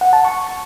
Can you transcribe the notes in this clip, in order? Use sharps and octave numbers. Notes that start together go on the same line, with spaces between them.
F#5
A5
C#6